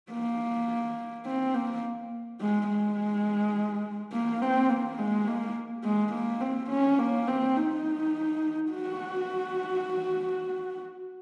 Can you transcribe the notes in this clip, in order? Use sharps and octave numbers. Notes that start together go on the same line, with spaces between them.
A#3
C4
A#3
G#3
G#3
A#3
C4
A#3
G#3
A#3
G#3
A#3
C4
C#4
A#3
C4
D#4
F#4